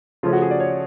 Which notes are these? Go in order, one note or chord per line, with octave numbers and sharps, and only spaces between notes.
C#3 F3 A3 C#4 F4
F#4
G#4
D5
C#5